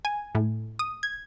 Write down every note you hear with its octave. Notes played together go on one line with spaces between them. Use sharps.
G#5
A2
D#6
G#6